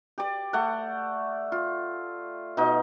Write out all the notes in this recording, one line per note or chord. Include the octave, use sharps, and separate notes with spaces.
G4 D5
A3 F#5
F4
B2 D#4